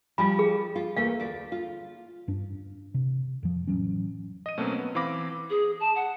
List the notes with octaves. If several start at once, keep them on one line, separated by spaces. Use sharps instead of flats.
F3 G3 F4 B5
G#4
F4
E2 A3 A#3 F5
D2 D5
F4
G2 D4
C3
F2 F3
A1 D#3 F#3 C#4
D#5 D#7
B2 F#3 A3 A#3 C4 C#4
B3
E3 C4 F5 B5 D6 A#6
G#4
A5
F#5